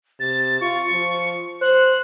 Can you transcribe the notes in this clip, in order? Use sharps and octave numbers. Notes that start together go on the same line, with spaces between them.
C3 A6
F4 C#6
F3
C5 F#6